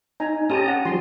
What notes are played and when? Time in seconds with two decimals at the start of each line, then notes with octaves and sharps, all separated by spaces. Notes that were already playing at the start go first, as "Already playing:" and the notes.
0.20 D#4 G#5 A#5
0.50 C#4 G4 A4 A5 A#5 D#6
0.68 F#5
0.85 F3 G3 C6